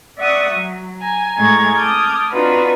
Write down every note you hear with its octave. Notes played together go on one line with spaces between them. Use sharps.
D5 E5 F#5 C#6 D#6
F#3
G#5 A#5
A2 G#3 A#5 C#6 G#6 A6
A5 D6 D#6 F6 G6 G#6
C4 D4 D#4 F4 F#4 B4